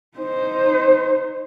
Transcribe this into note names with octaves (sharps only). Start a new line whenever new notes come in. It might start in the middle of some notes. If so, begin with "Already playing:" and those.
D#4 C5